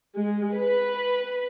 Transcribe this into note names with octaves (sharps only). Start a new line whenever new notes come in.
G#3
B4